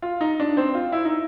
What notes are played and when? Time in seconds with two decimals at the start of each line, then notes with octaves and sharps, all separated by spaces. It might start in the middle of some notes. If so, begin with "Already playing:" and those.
0.02 F4
0.21 D#4
0.40 D4
0.57 C4
0.75 F4
0.92 E4
1.05 D#4